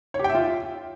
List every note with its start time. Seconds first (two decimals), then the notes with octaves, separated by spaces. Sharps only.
0.14 C#5
0.19 G4
0.24 G5
0.29 E5
0.35 F4